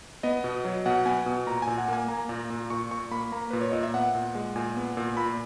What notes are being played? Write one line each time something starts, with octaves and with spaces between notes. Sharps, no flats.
B3 D#5
B2
F#3
B2 F#5
B3 G#5
B2
A#2 A#5
G#5
A#2
F#5
A#3 G#5
A#3 A#5
A#2
A#2
A#2 C#6
A#2 C#6
A#3 B5
A#3 A#5
A#2 B4
C#5
A#2 D#5
E5
B3 F#5
A#2
G#3
A#2 G#5
B3
A#2
A#2 B5